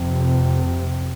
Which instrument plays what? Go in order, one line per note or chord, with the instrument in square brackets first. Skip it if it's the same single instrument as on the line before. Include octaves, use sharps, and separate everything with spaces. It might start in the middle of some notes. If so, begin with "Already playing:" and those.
Already playing: [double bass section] F2 C3